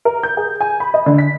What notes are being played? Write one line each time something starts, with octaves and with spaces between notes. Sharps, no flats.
A#4
G6
G#4
G#5
B5
D#5
D3
B6